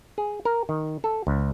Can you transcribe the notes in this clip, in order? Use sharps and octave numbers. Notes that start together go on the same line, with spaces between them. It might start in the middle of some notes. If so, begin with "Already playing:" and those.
G#4
A#4
D#3
A4
C#2